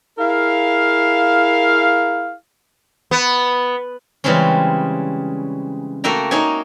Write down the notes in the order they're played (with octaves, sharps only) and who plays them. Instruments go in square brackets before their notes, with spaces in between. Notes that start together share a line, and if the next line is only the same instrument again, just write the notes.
[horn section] E4 G#4 A#4 F5
[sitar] B3
[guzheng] C#3 E3 G3 G#3 C4 C#4
A3 A#3 F#4 E5 G5 A#5
A#3 D#4 C#5 E5 G#5